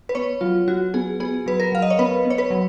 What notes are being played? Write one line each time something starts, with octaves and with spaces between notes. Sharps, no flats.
B4
B3 C#5
F#3 F4
F#3 F#4
B3 G#4
B3 G#4
F#3 B4
A#4
F#3 F5
D#5
C#5
B3 B4
B3
C#5
B4
F#3